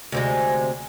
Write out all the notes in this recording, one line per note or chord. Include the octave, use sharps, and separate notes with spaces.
D2 C3 G#3